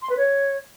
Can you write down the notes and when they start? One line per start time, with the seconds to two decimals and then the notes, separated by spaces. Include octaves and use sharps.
0.02 C6
0.09 B4
0.17 C#5